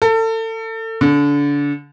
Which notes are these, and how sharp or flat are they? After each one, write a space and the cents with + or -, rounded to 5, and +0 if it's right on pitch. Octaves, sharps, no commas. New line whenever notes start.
A4 +30
D3 -30